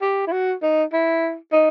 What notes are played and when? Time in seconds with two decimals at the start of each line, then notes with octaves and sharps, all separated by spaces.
0.02 G4
0.27 E4
0.32 F#4
0.63 D#4
0.93 E4
1.52 D#4